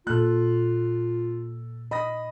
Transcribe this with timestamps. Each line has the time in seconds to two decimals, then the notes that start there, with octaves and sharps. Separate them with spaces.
0.07 A#2 A#3 F4 A4 F#6
1.91 D#5 B5 D#6 A#6